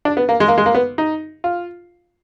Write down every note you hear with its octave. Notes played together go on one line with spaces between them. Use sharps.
D4
B3
A#3
G#3
A#3
G#3
A#3
B3
D#4
F4